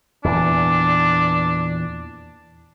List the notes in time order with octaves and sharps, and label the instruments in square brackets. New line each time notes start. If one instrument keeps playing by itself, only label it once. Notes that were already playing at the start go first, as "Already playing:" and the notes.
[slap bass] E2 A#2 E3 [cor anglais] D4